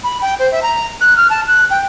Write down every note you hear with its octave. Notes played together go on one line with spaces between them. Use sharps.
B5
G5
C5
E5
A#5
F#6
F6
A5
F#6
G5